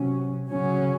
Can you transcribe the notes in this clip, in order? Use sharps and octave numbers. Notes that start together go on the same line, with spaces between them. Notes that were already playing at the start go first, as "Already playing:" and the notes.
Already playing: C3 F#3 C#4
C#3 F#3 C#4